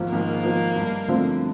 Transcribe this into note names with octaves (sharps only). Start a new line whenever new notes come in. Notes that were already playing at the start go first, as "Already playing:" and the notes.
Already playing: G#1 G#2 F3
G#1 A#3
G#2 F3
G2
D3 F3 A3 C4